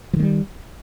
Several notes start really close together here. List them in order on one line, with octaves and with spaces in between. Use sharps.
F3 D#3 A3 G3